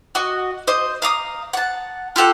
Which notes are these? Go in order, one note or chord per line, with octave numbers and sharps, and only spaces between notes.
F#4 D#5
C5 D#5
F5 A#5 D#6
F#5 A5
F4 G4 A4 F#5